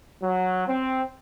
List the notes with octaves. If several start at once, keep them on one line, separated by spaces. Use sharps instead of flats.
F#3
C4